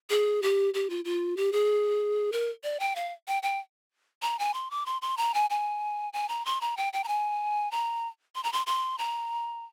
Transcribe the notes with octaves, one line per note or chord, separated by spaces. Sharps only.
G#4
G4
G4
F4
F4
G4
G#4
A#4
D5
G5
F5
G5
G5
A#5
G#5
C6
D6
C6
C6
A#5
G#5
G#5
G#5
A#5
C6
A#5
G5
G5
A#5
G#5
A#5
C6
A#5
C6
C6
A#5